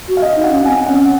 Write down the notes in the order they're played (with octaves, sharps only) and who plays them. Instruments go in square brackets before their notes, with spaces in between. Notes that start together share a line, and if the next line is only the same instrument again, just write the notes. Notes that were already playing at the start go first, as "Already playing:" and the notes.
[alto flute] F#4
[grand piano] F5
D#5
[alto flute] D#4
[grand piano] F#5
[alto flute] D#4
C#4
[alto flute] C4 [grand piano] G#5
[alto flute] C#4 [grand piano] F#5